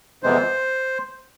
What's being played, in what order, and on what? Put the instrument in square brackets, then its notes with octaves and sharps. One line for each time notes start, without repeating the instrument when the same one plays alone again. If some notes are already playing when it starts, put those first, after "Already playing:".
[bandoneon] F2 C3 E3 G#3 B3 C5